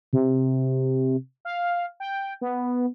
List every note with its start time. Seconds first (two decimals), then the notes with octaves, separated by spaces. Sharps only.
0.13 C3
1.45 F5
2.00 G5
2.41 B3